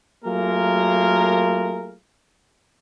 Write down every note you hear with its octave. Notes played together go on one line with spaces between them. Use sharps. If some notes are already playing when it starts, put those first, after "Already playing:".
F#3 A3 A#3 F4 G#4 A#4